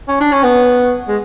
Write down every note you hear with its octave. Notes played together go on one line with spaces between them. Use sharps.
C#4
D4
C#4
B3
G#3